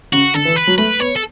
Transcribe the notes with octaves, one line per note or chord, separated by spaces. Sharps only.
C#3 F#4
D3 A4
E3
B4
F#3
A3 B4
B3 C#5
A4